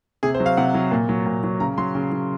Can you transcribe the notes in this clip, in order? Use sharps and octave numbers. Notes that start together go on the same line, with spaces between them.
C3 G#4
C5
F#3
F5
C3 F#5
F#3
A#2
F#3
A#2
F#3
C#3 A#5
F#3 C6
C#3
F#3